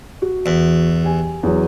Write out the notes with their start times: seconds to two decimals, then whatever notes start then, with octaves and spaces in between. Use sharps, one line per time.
0.22 F#4
0.46 E2
1.03 G4 G#5
1.43 E2 F#3